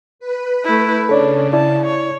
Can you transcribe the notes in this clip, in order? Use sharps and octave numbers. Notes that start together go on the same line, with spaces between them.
B4
A3 E4
C#3 D4 A4 C#5 D5
E4 D5 A5
C#5